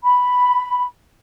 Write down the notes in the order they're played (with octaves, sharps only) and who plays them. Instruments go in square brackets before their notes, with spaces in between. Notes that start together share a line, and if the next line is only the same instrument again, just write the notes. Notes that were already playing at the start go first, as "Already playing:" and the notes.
[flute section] B5